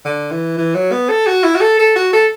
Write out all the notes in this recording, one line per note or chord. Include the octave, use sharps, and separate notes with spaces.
D3
E3
E3
F#3
B3
A4
F#4
E4
F#4
A4
A4
F#4
A4